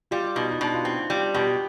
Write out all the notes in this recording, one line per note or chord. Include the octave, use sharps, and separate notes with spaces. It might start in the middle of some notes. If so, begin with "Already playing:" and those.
G3 F4
B2 D#4
D#4
B2 D4
F4
C4 D#4
G3 F4
B2 G4